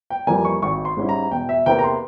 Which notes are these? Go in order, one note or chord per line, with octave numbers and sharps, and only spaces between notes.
G5
F2 E3 G3 A#3 G#5
C#6
G#1 C#6
C6
G#2 G3 C#4 E4
A#5
E1 G5
E5
E2 C3 E3 A#3 G5
A#5
C6